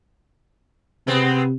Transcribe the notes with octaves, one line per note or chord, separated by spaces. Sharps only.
C3 G#3 B3 C4